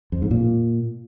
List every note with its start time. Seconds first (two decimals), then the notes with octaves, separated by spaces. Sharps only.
0.12 F2
0.22 G#2
0.31 A#2